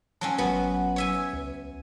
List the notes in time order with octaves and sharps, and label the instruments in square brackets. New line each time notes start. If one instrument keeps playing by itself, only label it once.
[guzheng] F#3 C4 C#4 [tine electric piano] G#5 A5
[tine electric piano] G#1 F#3 B4 [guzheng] B3 F#4
[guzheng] C#5 E5 G#5
[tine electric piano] C#2